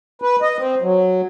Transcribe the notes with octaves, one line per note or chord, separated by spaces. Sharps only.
B4
D#5
C4
F#3